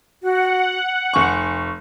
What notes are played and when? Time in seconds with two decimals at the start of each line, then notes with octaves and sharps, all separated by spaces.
0.23 F#4 F#5
1.14 F1 G#5 C#6